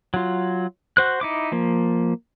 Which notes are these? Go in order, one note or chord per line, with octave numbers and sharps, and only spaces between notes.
F#3 F4
F#4 C5 F#6
D#4 E4 D6
F3 A#3